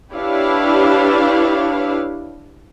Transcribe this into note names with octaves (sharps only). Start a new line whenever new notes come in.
D4 E4 G4 B4 C#5 F5